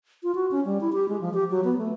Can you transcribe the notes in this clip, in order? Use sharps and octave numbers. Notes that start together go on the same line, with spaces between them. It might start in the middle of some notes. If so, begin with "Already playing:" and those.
F4
F#4
C#4
G3
E4
G4
G#3
F3
G4
F#3
B3
A3